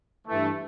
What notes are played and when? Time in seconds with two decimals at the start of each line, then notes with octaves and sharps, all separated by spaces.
0.27 G2 E3 A3